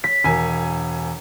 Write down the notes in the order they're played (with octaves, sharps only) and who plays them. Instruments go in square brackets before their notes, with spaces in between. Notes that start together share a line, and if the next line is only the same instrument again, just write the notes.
[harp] B6
[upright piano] E1 A#4 G#5